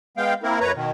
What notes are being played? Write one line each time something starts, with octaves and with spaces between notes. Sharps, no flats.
G#3 B3 F5 G5
A#3 C4 E4 A#4
F#2 B4 C#5 A#5
B2 D#3